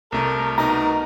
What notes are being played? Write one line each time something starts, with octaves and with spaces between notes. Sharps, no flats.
C2 A3 A#4
B2 D#4 A#4 A#5